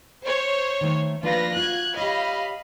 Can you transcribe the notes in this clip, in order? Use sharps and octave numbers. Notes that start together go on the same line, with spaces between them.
C5 C#5
D#3 A3
F3 A#3 D4 F4 B4 A#6
F4 F#4 F#6 G#6
G4 C#5 D#5 F5 B5